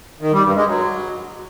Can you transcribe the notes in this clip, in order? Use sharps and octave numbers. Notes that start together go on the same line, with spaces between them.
D#3
G3
G2
G#3
F#3